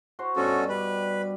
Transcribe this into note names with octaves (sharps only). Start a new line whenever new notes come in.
F#4 C5 A#5
G2 B2 C#4 F#4 A4 C#6
G3 G4 B4